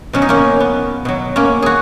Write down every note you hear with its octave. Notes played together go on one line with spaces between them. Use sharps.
B2 F#3 C#4
D#4
A#3 C#4
B3
B2 F#3
A#3 C#4
F#4 G#4